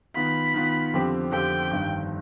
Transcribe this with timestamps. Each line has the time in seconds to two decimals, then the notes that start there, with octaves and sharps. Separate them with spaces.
0.15 D#3 B3 F4 B5
0.54 D#3 B3 F4
0.94 F2 D3 F3 C4 G4
1.32 F2 D3 F3 C4 G4 G5
1.71 G1 G2 D#3